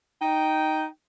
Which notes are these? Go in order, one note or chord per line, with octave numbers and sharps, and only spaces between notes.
D#4 G5